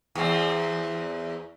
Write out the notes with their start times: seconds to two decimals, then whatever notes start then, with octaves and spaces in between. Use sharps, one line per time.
0.15 E2 C4